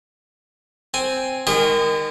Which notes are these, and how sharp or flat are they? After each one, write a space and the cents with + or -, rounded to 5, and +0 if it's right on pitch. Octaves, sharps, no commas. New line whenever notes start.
C4 +0 G#5 +0
D#3 +0 G#3 -30 G#4 -45